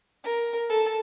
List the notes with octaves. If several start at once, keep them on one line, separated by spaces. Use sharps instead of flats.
A#4
A4